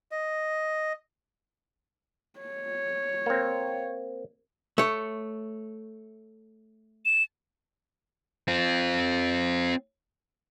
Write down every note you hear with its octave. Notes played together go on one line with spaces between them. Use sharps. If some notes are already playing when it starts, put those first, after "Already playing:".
D#5
C#5
A#3 C4
A3 C#5
E7
C4 F4